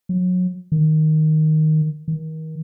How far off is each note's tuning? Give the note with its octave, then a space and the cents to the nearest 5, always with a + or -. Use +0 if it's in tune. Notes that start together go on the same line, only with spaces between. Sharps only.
F#3 -30
D#3 +0
D#3 +30